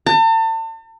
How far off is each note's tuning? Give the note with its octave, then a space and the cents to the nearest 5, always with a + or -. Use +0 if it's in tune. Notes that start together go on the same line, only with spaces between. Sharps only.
A5 +40